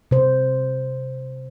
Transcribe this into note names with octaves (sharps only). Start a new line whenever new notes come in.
C3 C5